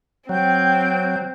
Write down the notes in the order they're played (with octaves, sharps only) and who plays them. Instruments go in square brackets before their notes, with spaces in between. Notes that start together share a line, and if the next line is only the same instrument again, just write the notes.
[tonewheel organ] F#3 [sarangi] C4 [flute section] G5 G6